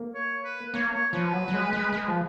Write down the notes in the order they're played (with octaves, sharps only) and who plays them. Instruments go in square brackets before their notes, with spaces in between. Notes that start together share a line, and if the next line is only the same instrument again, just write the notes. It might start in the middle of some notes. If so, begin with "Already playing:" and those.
Already playing: [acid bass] A#3
[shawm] C#5
B4
[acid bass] A#3 [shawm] C#5
[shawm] C#5
[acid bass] F3 [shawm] B4
[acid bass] F#3
F#3
G#3
G#3
G#3
F3